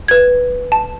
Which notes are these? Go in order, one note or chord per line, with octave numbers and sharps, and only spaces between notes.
B4 G#6
A5